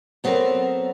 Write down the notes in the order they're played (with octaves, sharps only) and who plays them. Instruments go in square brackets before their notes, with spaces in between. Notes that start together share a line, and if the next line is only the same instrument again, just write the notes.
[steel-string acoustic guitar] F#3 B3 C4 A4 A#4